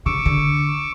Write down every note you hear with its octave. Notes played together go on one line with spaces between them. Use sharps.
C#3 C#6 D6 E6
D3